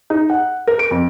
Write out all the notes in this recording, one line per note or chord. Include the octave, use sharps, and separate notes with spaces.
D#4
F#5
A#4
D7
F2